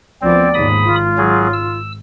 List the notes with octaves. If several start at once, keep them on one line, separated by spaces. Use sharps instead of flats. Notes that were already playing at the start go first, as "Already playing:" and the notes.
D2 F3 B3 C4 D5
D#2 G#2 B5 D#6
G#1 F4
F#3 G#4
E6